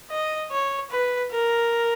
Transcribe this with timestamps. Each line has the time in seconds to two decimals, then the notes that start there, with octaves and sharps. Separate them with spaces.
0.11 D#5
0.51 C#5
0.91 B4
1.31 A#4